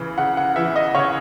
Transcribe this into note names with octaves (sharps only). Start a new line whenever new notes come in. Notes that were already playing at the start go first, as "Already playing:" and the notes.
Already playing: C#3 E3
C#3 F#5
F#5
E3 E5
D#5
C#3 C#5